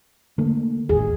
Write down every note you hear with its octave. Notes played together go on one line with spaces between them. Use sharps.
D3 A3 A#3
D#1 A1 D#2 G#4